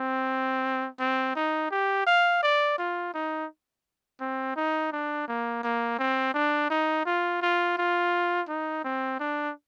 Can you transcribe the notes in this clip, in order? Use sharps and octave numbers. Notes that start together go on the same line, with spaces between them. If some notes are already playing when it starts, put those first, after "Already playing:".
Already playing: C4
C4
D#4
G4
F5
D5
F4
D#4
C4
D#4
D4
A#3
A#3
C4
D4
D#4
F4
F4
F4
D#4
C4
D4